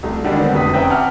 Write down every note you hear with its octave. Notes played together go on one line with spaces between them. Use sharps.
C2 A3
D3 D#3 G3 G#3 D4
D3 D#3 B3 C4
F1 B4 D#6 B6
C4 C#4 B4 E5 G5 A#5
F#5 G5 A5 D6 F6